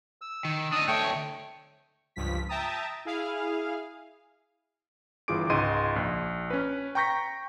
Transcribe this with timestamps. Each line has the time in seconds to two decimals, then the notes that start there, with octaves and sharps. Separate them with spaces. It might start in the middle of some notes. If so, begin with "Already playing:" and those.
0.21 E6
0.45 D#3
0.72 D4 D#5 D#6
0.88 D2 A3 C#5 G5
2.16 C#2 G2 F3 B6
2.48 E5 G5 A5 A#5 D#6
3.05 E4 G#4 F5
5.28 G1 E3 F4 G#4 D6 D7
5.50 C#2 G#2 D#5 C6 D#7
5.96 A#1
6.50 C#4 B4
6.95 G5 A#5 C#6 G6 A#6 B6